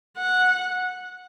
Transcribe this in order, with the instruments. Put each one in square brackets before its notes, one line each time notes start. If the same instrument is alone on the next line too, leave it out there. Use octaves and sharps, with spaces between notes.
[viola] F#5